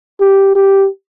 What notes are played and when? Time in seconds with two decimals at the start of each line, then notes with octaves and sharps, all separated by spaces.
0.20 G4
0.55 G4